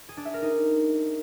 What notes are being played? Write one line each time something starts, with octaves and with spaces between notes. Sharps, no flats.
G#4
D4
E5
A#4
D#4